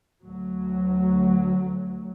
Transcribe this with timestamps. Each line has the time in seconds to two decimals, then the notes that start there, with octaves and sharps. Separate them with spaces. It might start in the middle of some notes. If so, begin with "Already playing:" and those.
0.25 D2 F#3